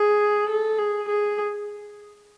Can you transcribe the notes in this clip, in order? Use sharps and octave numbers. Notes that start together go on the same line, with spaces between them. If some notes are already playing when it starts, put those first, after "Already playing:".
Already playing: G#4
A4
G#4
G#4